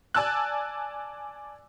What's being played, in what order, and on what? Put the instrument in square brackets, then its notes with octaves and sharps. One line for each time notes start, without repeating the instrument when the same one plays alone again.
[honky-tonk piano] D5 G#5 A5 E6 F#6